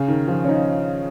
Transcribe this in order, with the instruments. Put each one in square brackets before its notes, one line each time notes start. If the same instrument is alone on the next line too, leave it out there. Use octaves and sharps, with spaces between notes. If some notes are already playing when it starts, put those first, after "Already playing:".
Already playing: [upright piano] C#3
D#3
F3
C#4
D#4